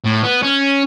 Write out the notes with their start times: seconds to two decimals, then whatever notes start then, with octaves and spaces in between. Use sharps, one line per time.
0.05 A2
0.23 B3
0.43 C#4